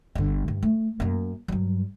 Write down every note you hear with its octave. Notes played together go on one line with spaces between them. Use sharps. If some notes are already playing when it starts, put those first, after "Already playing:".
G1 D3
G2
A3
F#2 A#3
G2 F#3